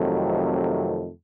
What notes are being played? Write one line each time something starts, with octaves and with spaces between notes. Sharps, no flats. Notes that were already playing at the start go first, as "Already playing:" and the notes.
Already playing: F2 C3 D#3 F#3 A3